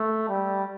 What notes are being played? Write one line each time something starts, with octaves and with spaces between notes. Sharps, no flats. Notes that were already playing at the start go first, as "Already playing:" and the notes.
Already playing: A3
G3